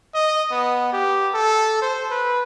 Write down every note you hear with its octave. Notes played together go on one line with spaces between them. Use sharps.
D#5
B3
G4
A4
C5
B4